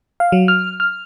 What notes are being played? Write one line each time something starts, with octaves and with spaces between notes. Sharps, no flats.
F5
F#3
F6
F6